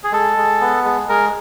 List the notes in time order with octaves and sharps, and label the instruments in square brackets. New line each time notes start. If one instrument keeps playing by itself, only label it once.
[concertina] G#4
G#3 A4
G#3
B3
G#3
G#3 A#4